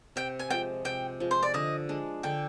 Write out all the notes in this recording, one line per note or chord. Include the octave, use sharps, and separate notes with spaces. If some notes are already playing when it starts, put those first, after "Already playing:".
C3 G5
G#5
F3 G#3 G5
C3 G5
F3 G#3
C5
D5
D3 D#5
G#3 D4
D3 G5